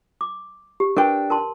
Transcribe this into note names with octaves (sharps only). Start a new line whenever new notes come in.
D6
G4
D4 A#4 B4 G5
A#4 A5 C6